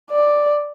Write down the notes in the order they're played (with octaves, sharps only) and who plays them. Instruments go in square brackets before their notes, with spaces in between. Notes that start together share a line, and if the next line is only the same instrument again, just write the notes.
[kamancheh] D5